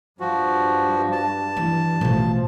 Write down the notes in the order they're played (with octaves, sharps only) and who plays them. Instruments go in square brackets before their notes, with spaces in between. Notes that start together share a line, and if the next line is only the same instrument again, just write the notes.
[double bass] G2 [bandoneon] F3 F#4
[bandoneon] A5
[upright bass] E3
[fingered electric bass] A1 [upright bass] B2 A3 [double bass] F3